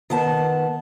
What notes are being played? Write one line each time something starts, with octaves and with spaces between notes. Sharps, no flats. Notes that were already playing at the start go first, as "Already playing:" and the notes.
D#3 B3 A5